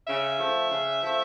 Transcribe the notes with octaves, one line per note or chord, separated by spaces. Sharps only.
C#3 E5
F3 A3
C#3
F3 A3